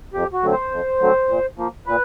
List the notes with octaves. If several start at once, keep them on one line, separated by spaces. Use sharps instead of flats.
F2 G4
F#4
D3 F#3 A3 C4
C5
F2
D3 F#3 A3 C4
A#2
F3 A#3
A#2 B4